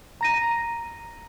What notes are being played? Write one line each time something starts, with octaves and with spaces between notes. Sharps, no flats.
A#5 A#6 D#7